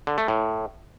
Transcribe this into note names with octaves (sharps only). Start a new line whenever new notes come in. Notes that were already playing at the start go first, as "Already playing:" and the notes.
D3
A3
A2